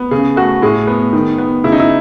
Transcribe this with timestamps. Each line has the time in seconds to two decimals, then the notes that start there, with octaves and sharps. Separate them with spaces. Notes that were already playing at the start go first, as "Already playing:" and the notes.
Already playing: B3
0.11 C#3 G#4
0.36 A3 F#4
0.62 A2 G#4
0.87 B3
1.13 D#3
1.38 B3
1.64 C#3 E4
1.72 D#4
1.80 E4